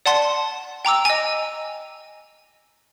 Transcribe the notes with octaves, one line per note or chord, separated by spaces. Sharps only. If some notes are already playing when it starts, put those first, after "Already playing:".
D5 F#5 A5 C6
G5 A#5 D6 E6
D#5 G#5